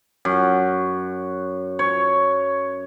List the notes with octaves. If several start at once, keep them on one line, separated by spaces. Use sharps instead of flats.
F#2
C#5